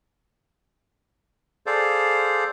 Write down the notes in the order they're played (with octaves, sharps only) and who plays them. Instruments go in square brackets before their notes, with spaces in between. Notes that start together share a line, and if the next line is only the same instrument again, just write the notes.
[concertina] G#4 A4 C5 D5 F5